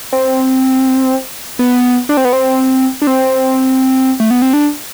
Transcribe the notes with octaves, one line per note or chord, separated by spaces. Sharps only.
C4
B3
D4
C4
B3
C4
D4
C4
A3
B3
C4
D4